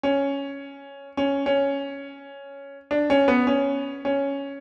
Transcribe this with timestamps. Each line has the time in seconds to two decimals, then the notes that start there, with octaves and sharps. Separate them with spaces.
0.03 C#4
1.17 C#4
1.46 C#4
2.91 D4
3.10 C#4
3.28 B3
3.47 C#4
4.05 C#4